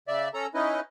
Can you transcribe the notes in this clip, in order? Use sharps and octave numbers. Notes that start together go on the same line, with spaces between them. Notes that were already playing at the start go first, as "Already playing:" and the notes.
C#3 D5 E5
C#4 A4 A#5
C#4 D#4 E4 B4 D#5